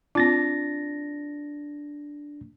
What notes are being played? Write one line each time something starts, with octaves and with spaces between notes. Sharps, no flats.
C4 D4 F4 A6 A#6